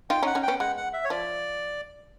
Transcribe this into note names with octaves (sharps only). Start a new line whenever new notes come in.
D#4 F4 G5
C#4 D#4
F#5
C#4 D#4
G5
B3 C#4
G#3 F#5
F#5
E5
C#5
F3 D5